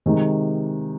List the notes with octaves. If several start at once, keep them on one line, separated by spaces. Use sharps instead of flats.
C3 D#3 G#3